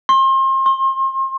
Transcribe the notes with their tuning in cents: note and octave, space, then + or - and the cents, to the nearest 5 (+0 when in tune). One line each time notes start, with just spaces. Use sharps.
C6 +35
C6 +45